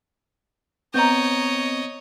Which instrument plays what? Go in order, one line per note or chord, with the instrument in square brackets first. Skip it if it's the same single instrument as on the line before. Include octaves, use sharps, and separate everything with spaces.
[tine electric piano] B3 C4 [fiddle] C#5 D#5 [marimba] A#5 G6